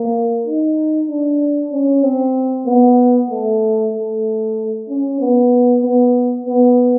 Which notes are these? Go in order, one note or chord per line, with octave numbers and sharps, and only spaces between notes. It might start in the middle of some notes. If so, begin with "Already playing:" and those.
Already playing: A#3
D#4
D4
C#4
C4
B3
A3
A3
C#4
B3
B3
B3